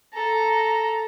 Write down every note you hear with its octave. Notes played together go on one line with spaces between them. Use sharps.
A4 A#5